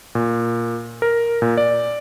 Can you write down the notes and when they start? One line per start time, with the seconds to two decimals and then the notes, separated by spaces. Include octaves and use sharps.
0.15 A#2
1.02 A#4
1.42 A#2
1.57 D5